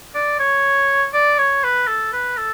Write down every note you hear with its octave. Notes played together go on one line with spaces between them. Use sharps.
D5
C#5
D5
C#5
B4
A4
B4
A4